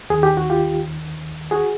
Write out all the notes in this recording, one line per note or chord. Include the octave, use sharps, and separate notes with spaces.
D#2 D#3 G#4
G4
F#4
F4 G4
F#4 G#4